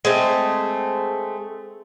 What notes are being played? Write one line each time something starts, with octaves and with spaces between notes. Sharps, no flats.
G#3 A3 C4